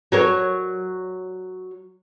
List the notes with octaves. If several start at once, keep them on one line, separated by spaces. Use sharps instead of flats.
F#3 A#4 C#5